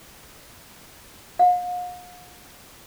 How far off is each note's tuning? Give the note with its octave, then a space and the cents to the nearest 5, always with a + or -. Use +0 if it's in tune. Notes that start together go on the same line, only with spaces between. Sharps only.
F5 +45